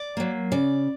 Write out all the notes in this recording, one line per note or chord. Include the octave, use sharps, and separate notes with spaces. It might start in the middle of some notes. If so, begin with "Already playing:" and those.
Already playing: D5
F#3 A#3
C#3 D5